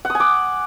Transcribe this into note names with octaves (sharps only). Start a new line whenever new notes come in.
F#5
D#6
G#5
D6